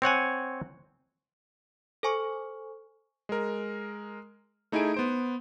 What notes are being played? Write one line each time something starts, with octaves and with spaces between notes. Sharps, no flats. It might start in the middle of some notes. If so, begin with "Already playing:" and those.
C4 C#5 F#5 G#5
A4 C5 G#5 C#6
G#3 A#4
A3 D#4 E4 G#4 G#5 D7
B3 C5 D7